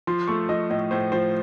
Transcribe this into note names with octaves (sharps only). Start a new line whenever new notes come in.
F3 C6
A3 C#6
F3 D#5
A2 D#5
A2 C5
F3 C5